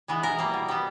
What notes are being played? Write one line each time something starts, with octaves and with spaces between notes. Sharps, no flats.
E3 G#3 B3
B2 A#4
G3 A#3
B2
G3 B3